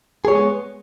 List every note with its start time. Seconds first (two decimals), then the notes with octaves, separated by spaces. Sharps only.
0.25 G#4
0.28 C#5
0.32 G#3
0.35 B3